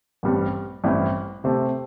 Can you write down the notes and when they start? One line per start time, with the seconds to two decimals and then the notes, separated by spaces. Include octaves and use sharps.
0.23 A1 G2 G3 C4
0.84 A1 G2 G3 C4 E4
1.44 C3 A3 C4 G4 C5